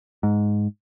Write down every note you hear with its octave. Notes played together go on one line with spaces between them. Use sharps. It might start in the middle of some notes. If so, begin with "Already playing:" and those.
G#2